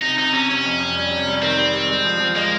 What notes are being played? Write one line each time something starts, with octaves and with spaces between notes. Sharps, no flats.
C3 D#4
C3 D#4
C3 C#4
C3 C#4
F2
F2
G3
C3
G3
D#3 C4
G3
G3
G#3
F3
F3
G#3 A#3